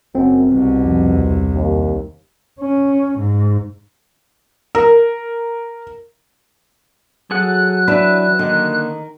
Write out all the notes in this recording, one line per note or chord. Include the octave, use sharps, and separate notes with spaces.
F#1 F#2 C4
C2 B2
F2
E2
D#2
C#4
G#2
A#4
F#3 G#4 A4 F#5 F#6
E3 D4 B4 E5
D3 D#3 A#3 D#4